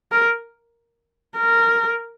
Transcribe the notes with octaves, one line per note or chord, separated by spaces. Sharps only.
A#4
A#4